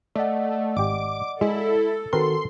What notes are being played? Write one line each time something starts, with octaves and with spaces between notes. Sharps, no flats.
A3 D5 D#5 F#5
G#1 G4 D6
G#3 E4 A4
D#3 C4 F#4 A#4 B4 C6